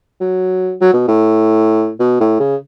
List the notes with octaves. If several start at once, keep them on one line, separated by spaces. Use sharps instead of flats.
F#3
F#3
B2
A2
B2
A2
C#3